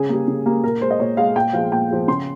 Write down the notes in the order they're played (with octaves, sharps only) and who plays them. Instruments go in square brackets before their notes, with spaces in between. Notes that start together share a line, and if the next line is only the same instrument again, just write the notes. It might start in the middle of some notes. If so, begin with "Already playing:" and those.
Already playing: [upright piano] C#3 G#4
G3 A#3
C#3
G3 A#3
A#2 A#4
G#3 C5
D#5
A#2 C#5
G#3 F5
A#2 G5
F3 G#3 F5
A#2 G5
F3 G#3
C#3 C6